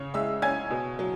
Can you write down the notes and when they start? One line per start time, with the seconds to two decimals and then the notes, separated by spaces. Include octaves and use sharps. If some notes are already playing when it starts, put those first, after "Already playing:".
Already playing: C#3 C#4 C#5
0.14 G#3 E5 E6
0.42 C#4 G#5 G#6
0.70 B2
0.99 F#3